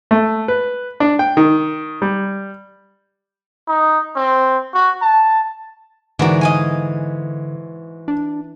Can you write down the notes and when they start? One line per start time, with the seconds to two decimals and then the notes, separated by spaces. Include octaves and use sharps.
0.11 A3
0.48 B4
1.00 D4
1.19 G5
1.37 D#3
2.02 G3
3.68 D#4
4.16 C4
4.74 F#4
5.02 A5
6.19 G#2 D3 E3 F#4 A#4 D5
6.41 D#5 F5 G#5
8.08 D4